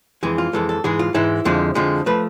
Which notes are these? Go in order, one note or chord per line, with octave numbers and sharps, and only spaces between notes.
F2 E3 G#3 G#4
F4
F2 E3 G#3 A4
A4
G#2 E3 G#3 G#4
F4
G#2 E3 G#3 E4
F2 D3 F3 G#3
F2 D3 F3 G#3
F3 A3 B4